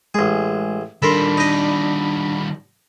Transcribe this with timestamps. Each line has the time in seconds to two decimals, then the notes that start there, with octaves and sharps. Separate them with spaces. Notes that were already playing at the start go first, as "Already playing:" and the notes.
0.14 A1 G#3 G#4
1.02 D#3 G3 D4 A4 A#4 B5 C6
1.38 D#4 D#5